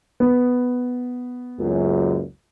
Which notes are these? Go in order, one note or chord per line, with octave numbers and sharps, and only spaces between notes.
B3
F#1 C#2 F#2